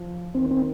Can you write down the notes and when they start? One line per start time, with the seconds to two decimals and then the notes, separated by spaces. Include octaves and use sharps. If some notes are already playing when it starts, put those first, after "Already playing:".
Already playing: F3
0.35 D#3 C4
0.51 C4